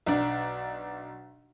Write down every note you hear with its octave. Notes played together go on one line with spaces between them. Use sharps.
B1 D4